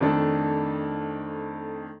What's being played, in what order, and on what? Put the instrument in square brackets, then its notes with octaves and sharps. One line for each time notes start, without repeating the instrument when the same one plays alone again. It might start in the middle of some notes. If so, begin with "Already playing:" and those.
[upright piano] F2 D#3 A3 D4 A4